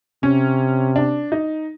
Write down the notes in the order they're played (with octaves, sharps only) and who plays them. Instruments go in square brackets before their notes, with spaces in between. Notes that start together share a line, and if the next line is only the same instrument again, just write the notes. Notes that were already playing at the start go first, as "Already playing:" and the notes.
[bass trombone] C3 [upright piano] C#4
[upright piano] D4
D#4